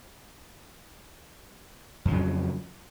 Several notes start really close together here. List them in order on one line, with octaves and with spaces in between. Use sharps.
F2 F3 C#3 F#3